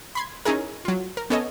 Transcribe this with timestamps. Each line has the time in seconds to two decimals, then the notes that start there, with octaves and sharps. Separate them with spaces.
0.15 B5 C6 G#6
0.45 C#4 D#4 E4 G#4 A#4
0.85 F#3 F4
1.17 A#4
1.30 B3 C#4 A4 C#5 D#5